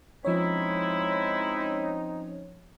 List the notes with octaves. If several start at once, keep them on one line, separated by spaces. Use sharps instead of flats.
F3 G#3 C4 C#4 D#4 E4 C#5